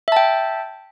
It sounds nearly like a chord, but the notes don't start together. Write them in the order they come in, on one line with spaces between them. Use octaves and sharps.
E5 A5 G5